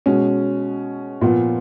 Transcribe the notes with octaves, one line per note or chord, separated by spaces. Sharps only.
B2 G#3 C#4
A#2 F3 B3 F4